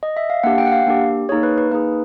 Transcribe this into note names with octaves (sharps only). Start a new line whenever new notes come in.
D#5
E5
F5
A#3 D4 G4 F#5
G5
F#5
F5
A#3 D4 G4
A#3 D#4 G#4 C#5
B4
B4
A#3 D#4 G#4 B4